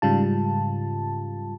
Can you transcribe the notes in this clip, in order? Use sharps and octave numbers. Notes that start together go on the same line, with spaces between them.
G#2 C#3 G3 F4 A5